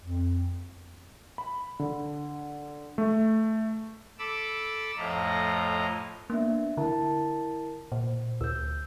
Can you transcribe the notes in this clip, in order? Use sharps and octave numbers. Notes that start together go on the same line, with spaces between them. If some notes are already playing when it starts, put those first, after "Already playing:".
F2
B5
D3
A3
A4 B5 D6 E6
F2 A2 F3 D#5 A#5
A#3 B3 D4 E5
D3 E4 A#4 A5
A#2 C5
D2 E6 G6